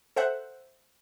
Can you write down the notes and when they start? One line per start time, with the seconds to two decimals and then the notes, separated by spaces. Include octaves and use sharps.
0.16 A4 C5 E5 F#5 F#6